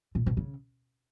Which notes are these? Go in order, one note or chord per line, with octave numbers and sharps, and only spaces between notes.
A#2
B2
C#3